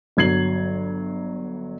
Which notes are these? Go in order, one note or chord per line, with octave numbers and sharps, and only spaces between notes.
G1 F#3 G#6 C7 F#7